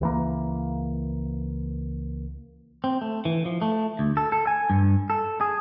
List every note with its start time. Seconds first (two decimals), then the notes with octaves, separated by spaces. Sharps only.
0.01 C#2 E3 A#3
2.84 C4
3.01 A3
3.25 E3
3.45 F3
3.62 A3
3.99 D2
4.17 A4
4.32 A4
4.47 G#5
4.70 G2
5.10 A4
5.41 G#4